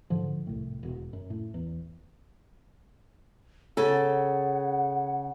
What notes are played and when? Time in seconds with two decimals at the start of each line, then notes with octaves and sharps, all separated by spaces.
0.10 G#2 D3 F3
0.47 C2 A2
0.83 E1 B2
1.13 F#2
1.30 A2
1.54 E2
3.77 C#3 A4 F#5